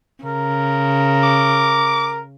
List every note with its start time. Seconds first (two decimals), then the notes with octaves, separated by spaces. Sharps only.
0.24 C#3 A#4
1.23 D6